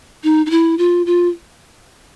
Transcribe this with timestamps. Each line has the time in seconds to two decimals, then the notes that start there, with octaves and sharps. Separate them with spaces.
0.24 D#4
0.46 D#4
0.50 E4
0.78 F4
1.06 F4